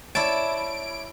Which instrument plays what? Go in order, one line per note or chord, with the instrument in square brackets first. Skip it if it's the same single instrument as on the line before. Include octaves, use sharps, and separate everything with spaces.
[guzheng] E4 A5 [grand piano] C#5 D5 [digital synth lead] D7